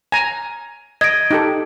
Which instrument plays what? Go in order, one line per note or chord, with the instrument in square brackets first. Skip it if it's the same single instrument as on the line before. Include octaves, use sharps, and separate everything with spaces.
[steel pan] G#5 A#5
[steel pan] D#5 [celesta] G#6 D7
[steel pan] D#4 G4 A4